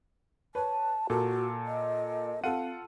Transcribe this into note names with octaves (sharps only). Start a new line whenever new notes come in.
B4 C#5 A5
A#2 F#4 A4 A#4
D#5
C4 F4 A4 F#5 D#7